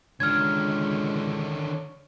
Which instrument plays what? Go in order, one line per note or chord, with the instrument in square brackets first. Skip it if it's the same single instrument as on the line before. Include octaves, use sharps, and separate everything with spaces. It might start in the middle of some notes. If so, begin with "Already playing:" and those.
[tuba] C#2 [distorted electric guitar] D3 D#3 [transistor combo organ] D4 C#5 [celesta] F6 G#6